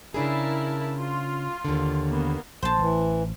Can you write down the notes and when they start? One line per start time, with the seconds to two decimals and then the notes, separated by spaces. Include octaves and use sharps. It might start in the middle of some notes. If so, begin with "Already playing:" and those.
0.14 C#3 D4 E4 G#4 A#4 A5
1.00 F4
1.65 D#2 D3
2.08 A#3 B3
2.63 A#1 C5 A5
2.79 A1 E3